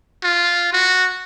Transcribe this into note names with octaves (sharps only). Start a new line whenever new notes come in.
F4
F#4